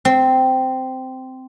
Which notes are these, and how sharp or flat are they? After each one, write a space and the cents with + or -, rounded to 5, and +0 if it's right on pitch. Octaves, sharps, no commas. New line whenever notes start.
C4 -10